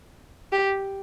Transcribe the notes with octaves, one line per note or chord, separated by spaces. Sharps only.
G4